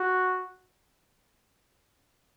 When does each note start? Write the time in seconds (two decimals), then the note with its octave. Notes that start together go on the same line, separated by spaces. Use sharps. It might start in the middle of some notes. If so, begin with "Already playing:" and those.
Already playing: F#4